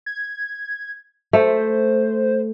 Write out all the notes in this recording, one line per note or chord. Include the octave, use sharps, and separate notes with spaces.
G#6
A3 C5